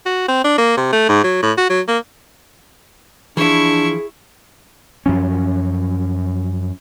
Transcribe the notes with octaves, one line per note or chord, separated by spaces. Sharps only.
F#4
C4
D4
A#3
C3
A3
G#2
F#3
A2
F#4
F#3
A#3
E3 F3 D4 E4 G#4 C#6
F#2 F3 C#4